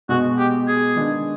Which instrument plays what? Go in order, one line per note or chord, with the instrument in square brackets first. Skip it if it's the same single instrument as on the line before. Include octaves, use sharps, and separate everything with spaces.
[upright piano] B2 G#3 B3 [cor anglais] F#4
[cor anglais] G4
G#4
[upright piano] D#3 G#3 B3 D4